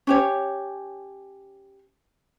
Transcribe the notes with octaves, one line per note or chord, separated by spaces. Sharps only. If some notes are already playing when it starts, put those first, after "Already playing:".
C#4 G4 C#5